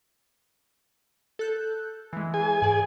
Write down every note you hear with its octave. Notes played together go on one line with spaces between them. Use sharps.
A4 F#6 G6
E3 G#3
G#4 G#5
G#2 D5